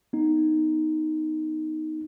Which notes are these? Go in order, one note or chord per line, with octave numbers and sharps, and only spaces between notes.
B3 D#4